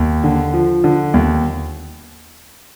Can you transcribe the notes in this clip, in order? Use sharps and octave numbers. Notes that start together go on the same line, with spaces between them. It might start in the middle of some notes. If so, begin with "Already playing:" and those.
Already playing: D#2
D3
F3
D3
D#2